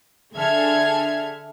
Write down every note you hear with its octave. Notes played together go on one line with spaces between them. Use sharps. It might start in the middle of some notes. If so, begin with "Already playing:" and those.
D3 G#4 A4 E5 F6 G#6